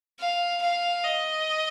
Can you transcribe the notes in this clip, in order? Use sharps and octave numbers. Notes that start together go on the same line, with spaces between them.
F5
F5
D#5